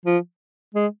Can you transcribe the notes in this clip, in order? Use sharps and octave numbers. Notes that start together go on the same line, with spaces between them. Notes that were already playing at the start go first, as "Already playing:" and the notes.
F3
G#3